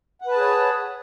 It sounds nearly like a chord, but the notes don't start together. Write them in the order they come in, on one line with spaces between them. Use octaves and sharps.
F#5 B4 A5 G#4 C#5